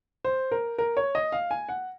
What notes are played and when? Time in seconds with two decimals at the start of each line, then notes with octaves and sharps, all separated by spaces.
0.25 C5
0.52 A#4
0.78 A#4
0.97 C#5
1.15 D#5
1.32 F5
1.51 G#5
1.69 F#5